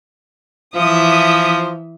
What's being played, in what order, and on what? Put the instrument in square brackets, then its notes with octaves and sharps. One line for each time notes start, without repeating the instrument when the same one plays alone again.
[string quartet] E3 E5 D#6 [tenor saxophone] F3